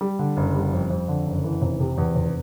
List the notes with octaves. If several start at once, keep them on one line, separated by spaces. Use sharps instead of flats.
G3
D3
F#1
G3
F2
F2
D3
F#1
E3
F1
C3
E2
F1